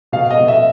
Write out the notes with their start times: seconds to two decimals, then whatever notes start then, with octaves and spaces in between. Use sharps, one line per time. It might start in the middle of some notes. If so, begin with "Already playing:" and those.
0.12 B2 F5
0.30 D#5
0.39 B2
0.48 E5